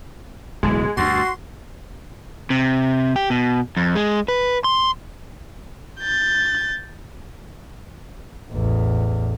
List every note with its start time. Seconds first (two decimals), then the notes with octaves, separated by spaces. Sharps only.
0.63 D1 B1 E3 G#3
0.97 D2 G2 F#4 C6
2.50 C3
3.16 G4
3.30 B2
3.77 F2
3.95 G#3
4.28 B4
4.64 C6
6.00 G6 A6
8.51 A1 E2